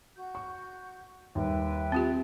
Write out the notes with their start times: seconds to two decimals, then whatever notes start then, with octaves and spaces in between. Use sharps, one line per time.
0.15 F#4 G6
0.35 C#6
1.35 D#2 G3 B4 E5 G5
1.92 C4 F4 G4